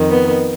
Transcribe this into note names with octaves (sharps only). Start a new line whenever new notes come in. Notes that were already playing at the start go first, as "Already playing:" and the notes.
Already playing: F2 D#3
B3